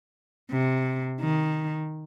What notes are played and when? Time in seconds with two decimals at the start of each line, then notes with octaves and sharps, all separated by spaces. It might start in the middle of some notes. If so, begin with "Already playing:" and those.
0.51 C3
1.21 D#3